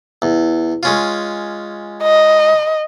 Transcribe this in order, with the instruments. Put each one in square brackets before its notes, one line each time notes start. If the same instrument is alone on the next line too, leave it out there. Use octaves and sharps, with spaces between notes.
[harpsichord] E2
G#3 C#4 F4
[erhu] D#5